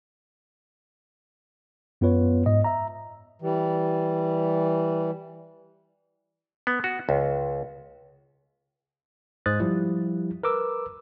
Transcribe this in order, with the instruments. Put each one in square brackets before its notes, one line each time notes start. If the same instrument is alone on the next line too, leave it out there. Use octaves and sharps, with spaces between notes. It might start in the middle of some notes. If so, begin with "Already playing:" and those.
[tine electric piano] F#2 B3 F4 B4 C#5
G#2 D#5
E5 A#5
[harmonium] E3 G3
[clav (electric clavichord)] B3
F#4
C#2
[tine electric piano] G#2 G#3 C5 D#6 F#6 A6
F3 G3 E4 G4
A#4 B4 D6 E6